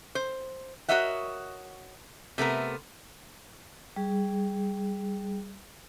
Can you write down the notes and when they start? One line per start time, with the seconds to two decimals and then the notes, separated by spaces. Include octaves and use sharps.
0.15 C5
0.88 F#4 A#4 C#5 D#5 E5 F#5
2.38 C3 A3 B3 A#4
3.96 G3 G#4